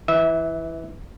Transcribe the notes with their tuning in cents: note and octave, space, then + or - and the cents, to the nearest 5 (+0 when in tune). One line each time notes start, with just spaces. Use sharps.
E3 +0 E5 -25